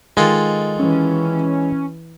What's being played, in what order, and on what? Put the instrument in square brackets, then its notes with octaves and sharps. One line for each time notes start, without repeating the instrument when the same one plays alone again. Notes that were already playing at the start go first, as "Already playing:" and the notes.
[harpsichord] D#3 F4 A4 [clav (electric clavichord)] G#3
[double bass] E3 [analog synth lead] C#4